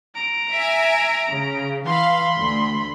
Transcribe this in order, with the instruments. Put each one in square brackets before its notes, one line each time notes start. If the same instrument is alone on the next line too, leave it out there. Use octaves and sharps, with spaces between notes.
[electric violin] A#5 D7
[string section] E5 G#5
C#3
[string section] E3 F5 [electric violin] B5 C6
[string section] D2